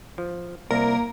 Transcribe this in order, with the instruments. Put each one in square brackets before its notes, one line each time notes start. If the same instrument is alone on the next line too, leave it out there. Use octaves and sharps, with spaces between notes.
[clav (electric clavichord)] F3
[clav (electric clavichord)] C2 [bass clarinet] A#3 [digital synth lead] A#4